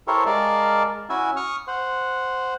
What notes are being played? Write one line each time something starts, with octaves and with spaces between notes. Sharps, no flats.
E4 G4 A4 A#4 C5 C#5
G#3 A#4 D5 F5 A5
C#4 E4 F#4 E5 G#5
C#6 D#6 F6
C5 F#5